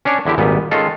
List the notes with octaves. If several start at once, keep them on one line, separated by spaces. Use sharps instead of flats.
C#4 D4 C#5 D5
E2 D3 E4 G4
G#1 A#2 G3 B3
D#3 G#3 C#4 F4 A4